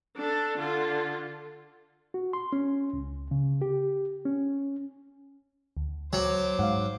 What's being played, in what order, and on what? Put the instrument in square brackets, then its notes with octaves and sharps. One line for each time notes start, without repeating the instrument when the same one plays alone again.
[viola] D4 A4
D3 F4
[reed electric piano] F#4
C6
C#4
C#2
C#3
G4
C#4
[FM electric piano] D2
[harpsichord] F#3 [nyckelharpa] C5 D6
[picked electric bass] G#2 [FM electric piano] F5 F#5